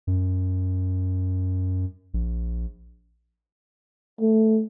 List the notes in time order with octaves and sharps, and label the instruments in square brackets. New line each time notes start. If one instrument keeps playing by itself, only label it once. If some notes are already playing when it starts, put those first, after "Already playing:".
[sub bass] F#2
A#1
[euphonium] A3